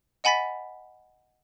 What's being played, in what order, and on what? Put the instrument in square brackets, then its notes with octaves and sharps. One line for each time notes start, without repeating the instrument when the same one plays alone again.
[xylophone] D#5 F#5 G#5 B5 A6 B6